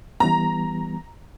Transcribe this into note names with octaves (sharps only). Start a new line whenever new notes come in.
E3 G3 B3 A#5